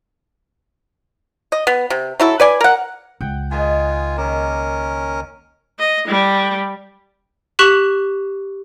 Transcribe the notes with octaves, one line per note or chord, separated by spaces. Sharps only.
D#5
B3
C3
F#3 E4 A4
B4 D5 G#5
A#4 F#5
C#2 F#5 G5
D#3 G#3 F4 D#5 G#5
D#3 A#3 C#4 A#4
D#5
G3
G4 C#6 F#6 B6 E7 F#7